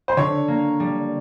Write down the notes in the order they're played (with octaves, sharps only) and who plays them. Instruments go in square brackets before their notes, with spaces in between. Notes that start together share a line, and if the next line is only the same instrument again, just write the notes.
[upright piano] C5
[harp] D3 [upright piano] C#5
[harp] A#3
G3